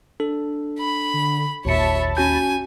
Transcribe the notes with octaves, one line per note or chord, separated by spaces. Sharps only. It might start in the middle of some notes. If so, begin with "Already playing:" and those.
D4 A4
B5
D3
G#1 D#2 A#2 C#5 E5 A5 B5 C#7
C#4 F#4 G#5 G6